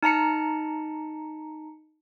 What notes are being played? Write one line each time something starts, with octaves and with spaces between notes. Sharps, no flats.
D#4 A5 A#5 C#7